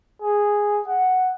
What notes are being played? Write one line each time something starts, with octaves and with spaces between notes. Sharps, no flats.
G#4
F#5